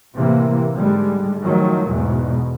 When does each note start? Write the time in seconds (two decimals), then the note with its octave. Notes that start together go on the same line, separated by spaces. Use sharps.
0.15 A2 C3 E3 A#3
0.75 G#2 D3 G3 G#3
1.44 D#3 F3 F#3 A3
1.90 E2 G#2 B2